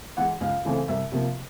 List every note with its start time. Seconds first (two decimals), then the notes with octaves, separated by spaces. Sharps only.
0.17 E3 G#3 F#5
0.41 C#2 F5
0.65 C#3 E3 A3 C4
0.88 C2 E5
1.12 C3 F3 A#3